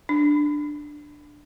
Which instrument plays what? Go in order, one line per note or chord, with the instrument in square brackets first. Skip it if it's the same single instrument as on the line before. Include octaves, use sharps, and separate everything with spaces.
[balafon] D4